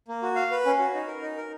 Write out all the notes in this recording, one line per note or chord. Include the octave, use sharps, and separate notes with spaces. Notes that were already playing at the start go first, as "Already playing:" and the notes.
A#3
F#4
F5
B4
C#4
F#4
D#4
A#4
D#4
A#4